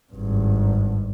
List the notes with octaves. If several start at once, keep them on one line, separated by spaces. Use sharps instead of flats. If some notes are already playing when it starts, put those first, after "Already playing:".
G#1 G2